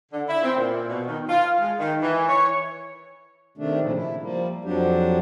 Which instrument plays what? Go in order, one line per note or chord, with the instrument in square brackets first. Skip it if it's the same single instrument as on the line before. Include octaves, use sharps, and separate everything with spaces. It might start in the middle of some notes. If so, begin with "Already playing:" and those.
[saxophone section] D3
E4
C4
A#2
B2
D#3
F4
G#3
D#3
E3
C#5
[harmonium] C3 D#3 A3 D4
A#2 C#3 F3
E4
F3 G3 A#3
F2 F3 F#3 D4 G4